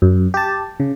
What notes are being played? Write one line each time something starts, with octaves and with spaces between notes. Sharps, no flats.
F#2
G4 A5
C#3